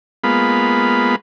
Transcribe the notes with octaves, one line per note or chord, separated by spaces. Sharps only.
G#3 A#3 B3 F4 B5